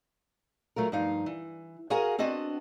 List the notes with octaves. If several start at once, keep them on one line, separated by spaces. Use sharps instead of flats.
F#3 A3 F4 A#4
G2 F3 D#4 F5
E3
F#4 G#4 A#4 F5 F#5 G#5
B3 C4 D4 F#4 D#5 A5